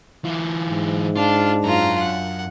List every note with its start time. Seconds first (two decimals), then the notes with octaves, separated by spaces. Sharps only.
0.25 E3 F4
0.69 G#2
1.16 D4 F4
1.64 F#2 F4 A#5
1.99 F#5